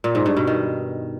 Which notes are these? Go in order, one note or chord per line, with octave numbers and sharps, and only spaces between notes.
A#2
G#2
G2
B2
D#3